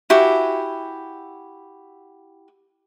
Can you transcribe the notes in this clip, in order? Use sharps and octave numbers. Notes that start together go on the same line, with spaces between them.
E4 F#4 G4 G#5